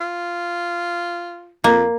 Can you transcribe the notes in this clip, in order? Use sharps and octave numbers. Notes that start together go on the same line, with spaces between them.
F4
F2 A#3